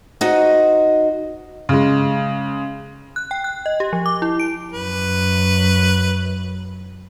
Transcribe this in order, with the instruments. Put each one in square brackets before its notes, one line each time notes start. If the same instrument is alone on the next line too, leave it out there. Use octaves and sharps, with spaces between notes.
[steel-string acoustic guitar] D#4 F#4 C5 D#5
[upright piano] C#3 G#3
[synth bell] F#6
G5
F#6
D#5
G4
F3
D6
E4
D7
[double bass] F#2 [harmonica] B4